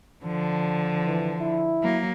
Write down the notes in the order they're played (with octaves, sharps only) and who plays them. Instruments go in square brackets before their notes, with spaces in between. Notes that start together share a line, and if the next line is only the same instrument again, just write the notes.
[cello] D3 F3
[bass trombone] E3
E4
[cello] F#3 A#3